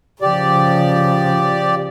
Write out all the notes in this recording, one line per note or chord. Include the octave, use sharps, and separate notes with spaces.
C#3 F3 G4 D5